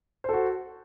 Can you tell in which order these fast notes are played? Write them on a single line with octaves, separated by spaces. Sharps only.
C5 A4 F#4